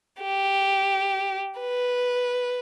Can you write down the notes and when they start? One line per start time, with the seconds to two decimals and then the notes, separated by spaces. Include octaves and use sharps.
0.23 G4
1.59 B4